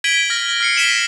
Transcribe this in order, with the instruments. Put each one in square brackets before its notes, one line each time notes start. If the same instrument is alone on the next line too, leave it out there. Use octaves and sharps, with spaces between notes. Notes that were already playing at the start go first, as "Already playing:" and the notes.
[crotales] G#6 B6 D7 D#7 F#7 G7
F6 A#6
F6 C7 C#7
B6 D#7 E7 F#7 G7